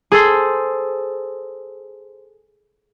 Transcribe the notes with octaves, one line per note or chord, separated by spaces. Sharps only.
G#4 A4 C5